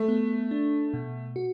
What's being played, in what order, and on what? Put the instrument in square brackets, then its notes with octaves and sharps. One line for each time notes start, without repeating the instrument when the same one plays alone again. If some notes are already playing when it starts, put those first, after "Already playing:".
Already playing: [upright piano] A3
[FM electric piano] B3
D4
B2
F#4